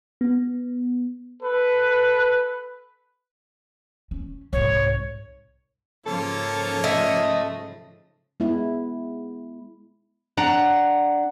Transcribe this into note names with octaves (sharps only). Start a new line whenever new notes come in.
B3
A4 B4
C#4
C2 G#2 C#5
G#2 C#3 F3 A#3 F4 A4 C#5
A3 D#5
G#3 B3 E4
D4 F#5 A#5